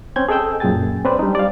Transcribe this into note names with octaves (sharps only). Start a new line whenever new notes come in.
C4 C#4 G6 G#6
G#4 A4 D#5 G5 E6 G6
F#2 A#2 G#4 G5 G#5 A6
C4 C#4 B4 C5 D5
G3 D4 D#4
D5 F5